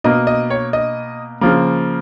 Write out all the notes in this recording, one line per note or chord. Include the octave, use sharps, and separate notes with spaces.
B2 A#3 D#5
D#5
C#5
D#5
C#3 F3 A#3